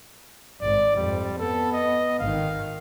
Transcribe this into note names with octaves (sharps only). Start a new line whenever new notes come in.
G#1 G#2 D5
F2 G#2 G3
B3 A4
D#5
G#1 D#3 F5